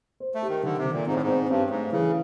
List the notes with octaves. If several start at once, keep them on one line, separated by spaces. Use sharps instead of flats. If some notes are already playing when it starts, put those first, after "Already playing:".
C5
A3
G4
D#3
D3 D#3
C3
D#3
A#2
G#2 C4
A2
G#2
C4
G2 C#4
G#2 A3
C#3 E3